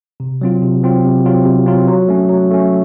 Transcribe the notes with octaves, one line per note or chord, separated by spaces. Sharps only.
C3
F#3 C4 F4
C3
F#3 C4 F4
C3
F#3 C4 F4
C3
F#3 C4 F4
F#3
A3 C#4
F#3
A3 C#4